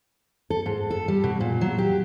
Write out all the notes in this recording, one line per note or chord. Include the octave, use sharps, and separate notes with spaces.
A4
G#2
A4
G3
B2
A#2
F#3
G4